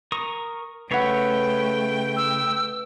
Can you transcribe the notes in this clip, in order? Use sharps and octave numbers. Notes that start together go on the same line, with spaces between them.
A#4 C#6 D#6
C#3 A3 B4 C#5 E5 F#5 G5
E6